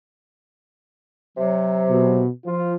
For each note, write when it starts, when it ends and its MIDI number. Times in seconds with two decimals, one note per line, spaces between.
1.38 2.23 48
1.38 2.23 54
1.89 2.28 47
2.46 2.75 53
2.46 2.75 65